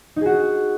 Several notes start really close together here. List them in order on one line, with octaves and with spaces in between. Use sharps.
D#4 G#4 F#4